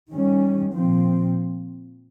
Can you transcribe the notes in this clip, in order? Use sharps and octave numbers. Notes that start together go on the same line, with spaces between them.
D#3 G3 C#4
A#2 F3 C4